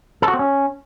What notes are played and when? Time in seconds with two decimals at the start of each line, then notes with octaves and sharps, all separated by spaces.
0.22 A4
0.28 F#4
0.34 C4
0.39 C#4